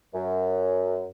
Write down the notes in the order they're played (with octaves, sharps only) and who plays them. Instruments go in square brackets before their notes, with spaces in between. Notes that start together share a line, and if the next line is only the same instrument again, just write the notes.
[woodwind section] F#2